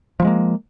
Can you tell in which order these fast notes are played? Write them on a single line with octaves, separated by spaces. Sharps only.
F3 G3 G#3 A#3